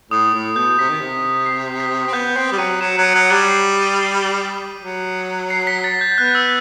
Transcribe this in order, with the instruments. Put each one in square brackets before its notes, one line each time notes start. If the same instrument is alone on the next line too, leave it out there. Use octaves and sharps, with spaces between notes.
[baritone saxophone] A2 [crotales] D#6
[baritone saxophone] A2
[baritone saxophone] B2 [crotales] G6
[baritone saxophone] C3 [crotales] B6
[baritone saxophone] D#3
C3
[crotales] C7
B6
[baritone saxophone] C4
[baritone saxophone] B3 [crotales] G6
[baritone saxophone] C4 [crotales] C7
[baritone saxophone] G3
[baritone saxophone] F#3 [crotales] D#7
[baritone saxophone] F#3 [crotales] E7
[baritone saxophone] F#3
[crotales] D#7
[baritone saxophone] F#3
[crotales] D#7
[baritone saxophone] G3
[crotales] C7
D#7
D#7
C7
[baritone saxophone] F#3
[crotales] C7
C7
B6
A6
G6
G6
[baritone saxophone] B3 [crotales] F#6
[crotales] E6